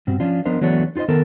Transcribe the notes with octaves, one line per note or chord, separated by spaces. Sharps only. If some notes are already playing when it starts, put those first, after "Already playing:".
G2 B2 C4
F3 C#4 D4 F4
F3 B3 D4 A#4 C5 D#5
E3 F#3 A3 B3 D4 C#5
D#4 F4 G#4 C5 D#5
D#3 B3 A4 A#4